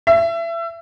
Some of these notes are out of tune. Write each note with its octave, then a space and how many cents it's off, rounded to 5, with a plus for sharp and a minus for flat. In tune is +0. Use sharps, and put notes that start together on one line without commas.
E5 +30